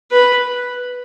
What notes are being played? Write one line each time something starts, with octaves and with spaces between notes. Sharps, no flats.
B4